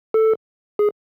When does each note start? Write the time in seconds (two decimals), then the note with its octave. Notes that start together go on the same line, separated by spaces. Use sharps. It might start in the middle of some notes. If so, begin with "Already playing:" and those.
0.14 A4
0.79 G#4